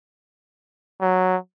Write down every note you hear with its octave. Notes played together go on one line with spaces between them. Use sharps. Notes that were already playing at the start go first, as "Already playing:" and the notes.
F#3